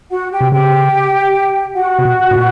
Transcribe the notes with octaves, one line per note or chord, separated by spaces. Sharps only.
F#4 F#5
G4 G5
C3
C#3 G4 G5
F#4 F#5
C3
B2
A2
A#2